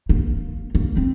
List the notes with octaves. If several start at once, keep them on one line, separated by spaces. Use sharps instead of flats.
A#3
A#3
C4